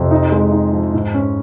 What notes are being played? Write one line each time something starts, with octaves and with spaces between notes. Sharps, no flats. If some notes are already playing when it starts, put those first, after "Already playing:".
Already playing: F2 C3
D#4
G#3
D#4
F3
G#2
C#4